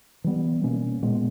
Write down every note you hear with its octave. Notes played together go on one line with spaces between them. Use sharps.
E3 G3 B3
B2 A#3 C#4
A#2 G#3 B3